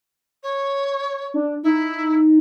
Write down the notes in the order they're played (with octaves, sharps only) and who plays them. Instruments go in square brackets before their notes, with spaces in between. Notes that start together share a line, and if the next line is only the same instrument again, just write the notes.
[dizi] C#5
[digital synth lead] D4
[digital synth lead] D#4 [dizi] E4